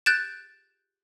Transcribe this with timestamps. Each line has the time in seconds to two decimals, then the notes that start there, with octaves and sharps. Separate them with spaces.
0.06 F#6 G6 A6 D7 E7